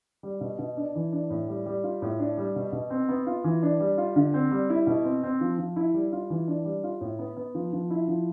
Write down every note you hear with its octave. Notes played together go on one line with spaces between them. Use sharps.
G3
B2
B2
D4
E3
D4
A2
G3
G3
F4
A2
D4
G3
B2
B2
C4
B3
F4
E3
D4
G3
F4
D3
C4
G3
E4
B2
C4
C4
F3
F3
E4
G3
F4
E3
D4
G3
F4
A2
B3
B3
F3
F3
E4
F3